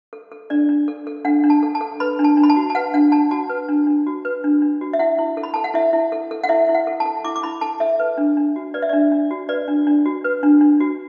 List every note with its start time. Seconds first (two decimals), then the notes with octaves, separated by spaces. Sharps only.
0.13 A4
0.32 A4
0.50 D4 D5
0.69 D4
0.88 A4
1.07 A4
1.25 D4 F#5
1.44 D4
1.50 A5
1.63 A4
1.75 A5
1.81 A4
2.00 B4 B5
2.19 D4
2.24 A5
2.37 D4
2.43 B5
2.50 A5
2.56 F#4
2.70 A5
2.75 B4 F#5
2.94 D4 F#5
3.12 D4 A5
3.31 F#4 A5
3.49 B4
3.69 D4
3.87 D4
4.07 F#4
4.25 B4
4.44 D4
4.62 D4
4.81 F#4
4.93 E5
4.99 E4 F#5
5.19 E4
5.37 A4
5.43 B5
5.54 A4 A5
5.64 F#5
5.74 E4 E5
5.93 E4
6.12 A4
6.31 A4
6.44 F#5
6.49 E4 E5
6.69 E4
6.75 F#5
6.87 A4
7.00 A5
7.06 A4
7.24 E4 D6
7.36 D6
7.43 E4 B5
7.61 A4 A5
7.80 A4 E5
8.00 B4
8.18 D4
8.37 D4
8.56 F#4
8.74 B4 D5
8.82 E5
8.89 D4 D5
9.12 D4
9.31 F#4
9.49 B4 D5
9.68 D4
9.87 D4
10.06 F#4
10.24 B4
10.43 D4
10.61 D4
10.80 F#4